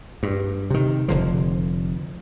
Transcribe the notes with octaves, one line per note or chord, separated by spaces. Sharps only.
G2
C3 D#3
F1 D3 F3